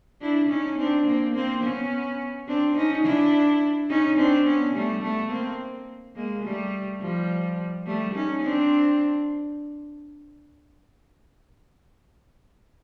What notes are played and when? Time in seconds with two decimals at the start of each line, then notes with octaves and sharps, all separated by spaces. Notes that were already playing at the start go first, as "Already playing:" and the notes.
0.21 D4 E4
0.49 C#4 D#4
0.78 C4 D4
1.06 A#3 C4
1.34 A#3 C4
1.63 B3 C#4
2.48 C4 D4
2.76 C#4 D#4
3.04 D4 E4
3.89 C#4 D#4
4.17 C4 D4
4.47 B3 C#4
4.75 G3 A3
5.03 A3 B3
5.31 A#3 C4
6.15 G#3 A#3
6.44 G3 A3
7.00 F3 G3
7.86 G3 A3
8.14 C#4 D#4
8.42 C4 D4